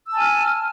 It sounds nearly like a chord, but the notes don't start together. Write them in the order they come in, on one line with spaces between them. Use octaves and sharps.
E6 A5 G#5 F6